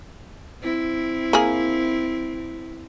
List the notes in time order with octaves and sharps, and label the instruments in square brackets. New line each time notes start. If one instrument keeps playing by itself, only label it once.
[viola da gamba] C4 E4
[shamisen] A#3 G#4